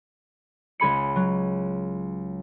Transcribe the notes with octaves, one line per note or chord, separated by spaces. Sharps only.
C#2 G#4 B5 C#7
F#3